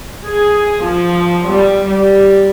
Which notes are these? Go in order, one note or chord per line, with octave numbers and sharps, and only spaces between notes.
G#4
F3
G3
G3